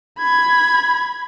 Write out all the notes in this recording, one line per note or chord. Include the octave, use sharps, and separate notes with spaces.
B5 G#6